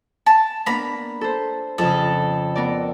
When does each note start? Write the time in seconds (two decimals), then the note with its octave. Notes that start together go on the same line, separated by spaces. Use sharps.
0.26 A5
0.66 A#3 B3 D4 A#5 B5
1.21 A4 C5
1.78 F2 C#3 A4
2.56 B3 A#4 D5